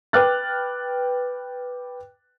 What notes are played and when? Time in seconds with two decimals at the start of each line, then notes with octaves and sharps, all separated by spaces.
0.13 B4 G5 D6 F6 F#6 A6